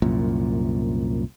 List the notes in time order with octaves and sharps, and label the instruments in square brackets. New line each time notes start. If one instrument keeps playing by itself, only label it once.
[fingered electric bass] C2 F#2 A#2